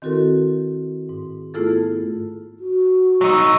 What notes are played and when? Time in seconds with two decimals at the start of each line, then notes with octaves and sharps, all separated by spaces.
0.02 D#3 C4 E4 F#4 A4 A#4
1.09 G#2
1.54 A3 B3 E4 F4 G#4 A4
2.60 F#4
3.21 F#3 D#4 C#6 E6